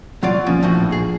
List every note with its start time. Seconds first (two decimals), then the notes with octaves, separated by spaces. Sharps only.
0.23 F#3 F4 D5
0.46 A#1 F3 C#4
0.63 A2 F3 F#4
0.92 G#4